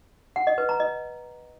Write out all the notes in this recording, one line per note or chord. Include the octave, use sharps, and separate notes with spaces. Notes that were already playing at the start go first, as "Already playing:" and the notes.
F#5
D#5
B4
A#5
D#5